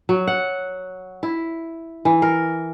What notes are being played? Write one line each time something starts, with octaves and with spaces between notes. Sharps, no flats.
F#3
F#5
E4
E3
A#4